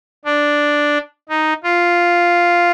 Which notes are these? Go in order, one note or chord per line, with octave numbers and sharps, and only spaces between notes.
D4
D#4
F4